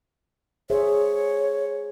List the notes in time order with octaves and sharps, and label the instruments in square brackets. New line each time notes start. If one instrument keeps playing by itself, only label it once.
[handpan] G#4 C5 E5 [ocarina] C#5